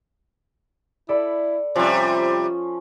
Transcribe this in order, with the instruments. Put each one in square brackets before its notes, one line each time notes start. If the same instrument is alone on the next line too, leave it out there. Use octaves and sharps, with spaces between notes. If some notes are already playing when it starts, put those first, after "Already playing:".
[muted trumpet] E4 [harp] A4 D5 B5
[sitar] C3 G3 [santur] F3 C#4 [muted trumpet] C5